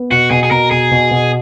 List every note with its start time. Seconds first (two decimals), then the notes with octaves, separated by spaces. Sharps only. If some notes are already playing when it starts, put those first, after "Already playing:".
Already playing: B3
0.11 B2 F#4
0.30 B2 G#4
0.43 G#4
0.51 B2 A#4
0.71 B2 G#4
0.91 B2
1.11 B2